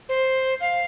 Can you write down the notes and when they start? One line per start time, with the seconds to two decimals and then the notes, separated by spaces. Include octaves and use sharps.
0.09 C5
0.61 F5